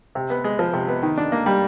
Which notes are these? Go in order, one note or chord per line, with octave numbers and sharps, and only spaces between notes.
C3
B3
G#3
F3
C3
B3
D#3
D4
A#3
G3